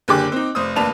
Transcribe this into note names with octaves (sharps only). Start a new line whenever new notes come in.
F#1 D3 G4 G#4 D6 F#6
C4 D#4
F1 C5 D#6
F1 D#2 D4 B4 A5 F7